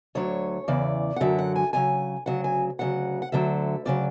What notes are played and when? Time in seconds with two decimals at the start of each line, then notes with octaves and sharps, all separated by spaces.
0.15 D2 D3 F#3 C#5
0.68 E2 C#3 E3 D5
1.16 F#5
1.20 F#2 D3 F#3 E5
1.39 F#5
1.56 G#5
1.73 E2 C#3 F#3 G#5
2.26 D2 C#3 F#3 F#5
2.44 G#5
2.79 D2 C#3 F#3 F#5
3.22 F#5
3.32 D2 D3 F#3 E5
3.85 D2 C#3 F#3 D5